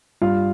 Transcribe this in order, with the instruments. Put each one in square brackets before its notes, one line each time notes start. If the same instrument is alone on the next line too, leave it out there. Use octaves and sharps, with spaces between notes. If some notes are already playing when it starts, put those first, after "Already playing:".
[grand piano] G2 F4 F5